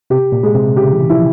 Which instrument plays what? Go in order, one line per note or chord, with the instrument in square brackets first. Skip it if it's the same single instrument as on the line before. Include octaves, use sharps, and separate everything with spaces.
[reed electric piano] C3 [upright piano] G4
[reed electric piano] A#2
[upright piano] G#3
[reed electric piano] C3
[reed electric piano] C#3 [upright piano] G4
[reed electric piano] E3
[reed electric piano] F3 [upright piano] E4